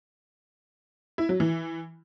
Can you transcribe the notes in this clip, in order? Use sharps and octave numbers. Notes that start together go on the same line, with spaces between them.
E4
F#3
E3